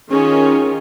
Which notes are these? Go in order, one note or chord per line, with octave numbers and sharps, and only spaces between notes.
D#3 C#4 F4 G#4